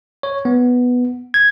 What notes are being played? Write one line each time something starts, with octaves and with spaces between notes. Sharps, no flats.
C#5
B3
G#6